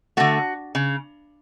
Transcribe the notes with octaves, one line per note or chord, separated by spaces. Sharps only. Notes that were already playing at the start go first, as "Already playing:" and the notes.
D3 A3 F#4
C#3